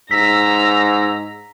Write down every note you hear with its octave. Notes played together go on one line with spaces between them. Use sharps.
G#2 A#5 E6 B6